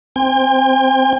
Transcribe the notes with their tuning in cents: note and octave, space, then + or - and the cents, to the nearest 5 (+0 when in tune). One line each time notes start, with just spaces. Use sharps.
C4 +0 G5 +45